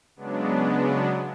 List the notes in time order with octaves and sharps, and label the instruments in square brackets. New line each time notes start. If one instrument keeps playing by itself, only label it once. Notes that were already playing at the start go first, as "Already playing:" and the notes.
[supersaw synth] C#3 F#3 G#3 B3 D4